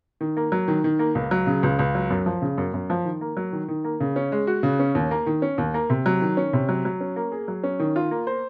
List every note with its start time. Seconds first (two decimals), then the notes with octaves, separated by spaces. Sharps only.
0.21 D#3
0.37 A#3
0.52 F#3
0.68 D#3
0.84 D#3
0.99 A#3
1.15 C#2
1.31 F#3
1.47 C#3
1.63 C#2
1.79 C#2
1.95 F#3
2.10 F#2
2.26 F3
2.42 C#3
2.58 F#2
2.74 F#2
2.90 F3
3.05 D#3
3.21 A#3
3.37 F#3
3.53 D#3
3.68 D#3
3.84 A#3
4.00 C#3
4.16 C#4
4.32 G#3
4.47 F#4
4.63 C#3
4.79 C#4
4.95 D#2
5.11 A#3
5.26 D#3
5.42 C#4
5.58 D#2
5.74 A#3
5.90 C3
6.06 F#3
6.22 D#3
6.37 C#4
6.53 C3
6.69 F#3
6.85 F#3
7.00 C#4
7.16 A#3
7.32 G#4
7.48 F#3
7.64 C#4
7.79 D#3
7.96 F4
8.11 A#3
8.27 C5